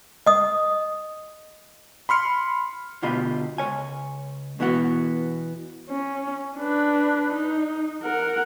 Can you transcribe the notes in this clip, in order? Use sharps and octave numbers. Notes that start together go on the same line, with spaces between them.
D#5 D#6
B5 C6 F6 C#7
D2 B2 F4 G4 D#5 B5
C#2 C#5 G#5
E2 B2 E3 B3 F#4
C#4
D4 B4
D#4
A#4 F#5